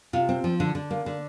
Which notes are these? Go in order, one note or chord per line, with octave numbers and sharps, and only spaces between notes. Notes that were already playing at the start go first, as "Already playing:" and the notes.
C3 F4
C4
F3
D3
D3
A#3
D3